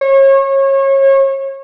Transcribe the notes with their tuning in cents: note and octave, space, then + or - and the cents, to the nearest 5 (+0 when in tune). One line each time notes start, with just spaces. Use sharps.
C#5 -30